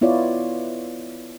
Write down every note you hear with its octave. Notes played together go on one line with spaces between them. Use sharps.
B3 E4 F4 C#5 D5